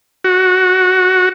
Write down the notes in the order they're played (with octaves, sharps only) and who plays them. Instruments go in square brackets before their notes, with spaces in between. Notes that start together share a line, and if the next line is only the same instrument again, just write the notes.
[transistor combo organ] F#4